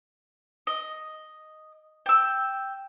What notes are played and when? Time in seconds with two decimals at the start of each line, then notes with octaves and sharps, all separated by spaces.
0.67 D#5
2.06 G5 E6